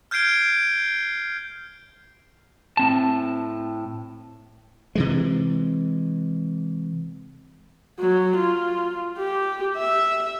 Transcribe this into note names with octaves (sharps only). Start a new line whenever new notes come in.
F6 G6 G#6 C7 D7 G7
A2 C4 A5
C3 E3 G#3
F#3
F4
G4
E5